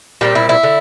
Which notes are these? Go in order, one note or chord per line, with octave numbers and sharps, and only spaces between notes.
A#2 G3 C4 G4
E4
E4
D3